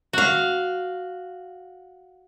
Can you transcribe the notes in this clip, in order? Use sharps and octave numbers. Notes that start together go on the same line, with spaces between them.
F#4 F5